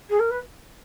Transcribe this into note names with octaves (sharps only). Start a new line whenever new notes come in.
G#4
A#4
B4